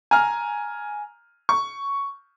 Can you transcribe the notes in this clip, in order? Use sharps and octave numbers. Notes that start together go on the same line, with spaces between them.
G#5 A#5 F6
C#6